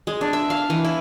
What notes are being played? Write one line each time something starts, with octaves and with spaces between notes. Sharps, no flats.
G#3
D4
E5
F5
E3
E4